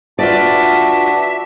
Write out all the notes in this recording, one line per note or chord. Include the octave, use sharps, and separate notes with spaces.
D4 F4 F#4 B4 D5 E5